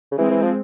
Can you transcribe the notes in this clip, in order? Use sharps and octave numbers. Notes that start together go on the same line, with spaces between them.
C#3
E3 G#3 C4
E3
F3